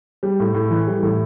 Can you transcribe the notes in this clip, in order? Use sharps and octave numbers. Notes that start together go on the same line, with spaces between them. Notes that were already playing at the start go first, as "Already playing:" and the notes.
G3
A2
A2
E3
G3
A2